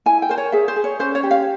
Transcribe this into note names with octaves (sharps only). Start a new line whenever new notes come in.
E4 G#5
G5
A#4 C5
C#5
G#4 E5
C5
G#4
C#5
C#4 C5
C#5
G4
F5